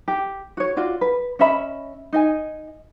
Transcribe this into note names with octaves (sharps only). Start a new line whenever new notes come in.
G4
F#4 C#5
F4 F#4 D5
B4
C#4 D#5 E5 B5
D#4 D#5 G#5